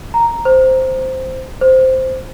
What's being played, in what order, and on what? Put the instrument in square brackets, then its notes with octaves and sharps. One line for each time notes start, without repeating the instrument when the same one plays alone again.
[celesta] A#5
C5
C5